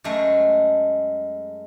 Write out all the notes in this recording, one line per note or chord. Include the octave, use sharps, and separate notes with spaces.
F#2 G#3 A3